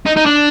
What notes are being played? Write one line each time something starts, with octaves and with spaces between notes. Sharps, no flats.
D#4
D#4
D4